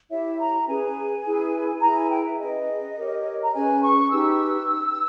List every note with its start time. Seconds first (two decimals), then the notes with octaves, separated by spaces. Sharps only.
0.09 E4 G4 C#5 E5
0.38 A#5
0.67 C#4 G#4 B4 G#5
1.25 E4 G#4 B4
1.81 E4 G#4 B4 A#5
1.96 G#5
2.10 G5
2.25 E5
2.39 C#4 G#4 B4 D#5
2.95 G4 A#4 C#5
3.42 A#5
3.53 C#4 G#4 B4 G#5
3.81 C#6
4.10 D#4 G4 B4 E6